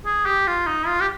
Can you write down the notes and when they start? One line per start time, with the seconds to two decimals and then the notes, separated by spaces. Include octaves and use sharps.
0.05 G#4
0.26 G4
0.47 F4
0.67 D#4
0.87 F4
1.01 G4